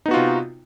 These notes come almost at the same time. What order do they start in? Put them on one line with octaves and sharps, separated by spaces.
D#4 B3 F#4 F4 C3